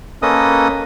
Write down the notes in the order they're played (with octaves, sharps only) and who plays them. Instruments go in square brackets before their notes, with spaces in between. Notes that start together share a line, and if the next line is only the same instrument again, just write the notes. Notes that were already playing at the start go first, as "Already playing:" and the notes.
[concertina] A#3 C#4 A4 B4 D#5 D#6